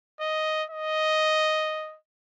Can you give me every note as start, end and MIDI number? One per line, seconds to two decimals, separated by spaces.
0.21 0.64 75
0.70 1.97 75